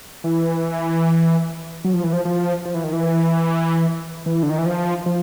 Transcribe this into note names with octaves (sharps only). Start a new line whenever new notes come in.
E3
F#3
F3
E3
F3
F3
F3
E3
D#3
E3
E3
D3
D#3
E3
F3
F3